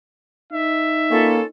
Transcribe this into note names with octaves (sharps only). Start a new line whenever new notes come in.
D#4 E5
A#3 C#4 F4 A4